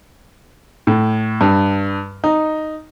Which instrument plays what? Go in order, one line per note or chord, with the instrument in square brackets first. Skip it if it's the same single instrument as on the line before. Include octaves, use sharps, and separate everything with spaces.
[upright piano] A2
G2
D#4